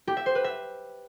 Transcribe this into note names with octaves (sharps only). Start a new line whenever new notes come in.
G4
E5
C5
B4
E5